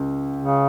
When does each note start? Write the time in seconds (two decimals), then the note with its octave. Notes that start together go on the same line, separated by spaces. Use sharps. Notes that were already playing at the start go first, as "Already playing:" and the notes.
Already playing: C#2
0.39 C#3